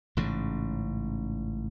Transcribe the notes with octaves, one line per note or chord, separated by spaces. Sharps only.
A1 G#2 C#3